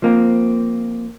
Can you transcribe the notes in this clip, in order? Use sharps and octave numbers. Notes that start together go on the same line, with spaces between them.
F3 A#3 C4